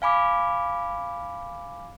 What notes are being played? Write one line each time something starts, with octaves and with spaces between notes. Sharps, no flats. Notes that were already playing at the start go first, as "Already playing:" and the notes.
F5 G#5 B5 D6